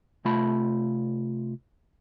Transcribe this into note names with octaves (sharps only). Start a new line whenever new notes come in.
C3 A3 F4 A5 B5